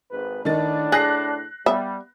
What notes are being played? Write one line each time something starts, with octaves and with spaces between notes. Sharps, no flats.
G#1 G#2 B4
A2 D#3 D4 D#4 A6
G#4 F#6 A#6 C7
G3 B3 E5